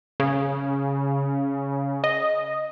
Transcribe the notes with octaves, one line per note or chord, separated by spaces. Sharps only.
C#3
D#5